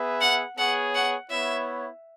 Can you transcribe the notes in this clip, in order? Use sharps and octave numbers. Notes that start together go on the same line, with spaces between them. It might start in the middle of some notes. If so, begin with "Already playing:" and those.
Already playing: B3 G#4 B4 E5
F#5
B3 G#4 C#5 F#5
F#5
B3 E4 C#5 E5